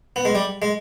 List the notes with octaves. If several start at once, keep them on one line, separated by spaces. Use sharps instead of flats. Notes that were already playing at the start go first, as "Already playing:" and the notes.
B3
G#3
G3
G#3